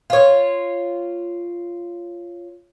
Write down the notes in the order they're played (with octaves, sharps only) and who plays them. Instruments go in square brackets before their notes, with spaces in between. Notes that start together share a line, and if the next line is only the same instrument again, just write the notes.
[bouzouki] F4 C#5